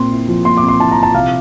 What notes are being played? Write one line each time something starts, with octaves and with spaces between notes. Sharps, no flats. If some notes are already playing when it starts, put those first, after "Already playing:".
Already playing: A#2 C4 C6
E4
F3
A#2 C6
D6
C4
C6
E4 A5
A#5
F3
A5
C3 F5